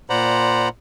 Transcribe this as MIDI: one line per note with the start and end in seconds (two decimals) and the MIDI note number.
0.10 0.69 46
0.10 0.69 72
0.10 0.69 74
0.10 0.69 78
0.10 0.69 82
0.10 0.69 83